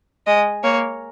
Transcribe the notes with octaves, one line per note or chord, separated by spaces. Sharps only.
G#3 D#5
A#3 C#5